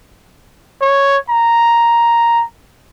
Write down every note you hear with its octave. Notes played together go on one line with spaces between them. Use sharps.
C#5
A#5